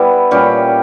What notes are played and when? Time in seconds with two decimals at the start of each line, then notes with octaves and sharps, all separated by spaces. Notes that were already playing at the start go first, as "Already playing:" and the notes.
Already playing: G3 B3 E4 B4
0.31 A#2 G3 C#4 G4